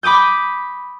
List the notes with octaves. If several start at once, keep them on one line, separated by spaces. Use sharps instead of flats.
B5 D6 D#6 G6